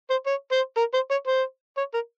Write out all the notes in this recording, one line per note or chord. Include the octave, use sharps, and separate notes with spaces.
C5
C#5
C5
A#4
C5
C#5
C5
C#5
A#4